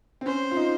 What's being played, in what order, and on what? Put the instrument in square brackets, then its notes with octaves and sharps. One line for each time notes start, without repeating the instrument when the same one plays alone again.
[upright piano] C4
[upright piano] C#4 [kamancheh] C5
[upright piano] F4
D#4